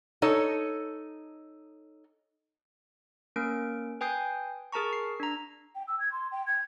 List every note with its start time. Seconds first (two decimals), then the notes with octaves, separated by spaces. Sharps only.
0.22 D#4 A4 C#5
3.36 A#3 C#4 A#4 D7
4.01 B4 G5 G#5 D#6 G6 C7
4.72 G#4 A#4 A5 A#5 C#6
4.93 C7
5.20 D4 A#5
5.75 G5
5.87 E6
5.99 G#6
6.12 C6
6.31 G5
6.46 G#6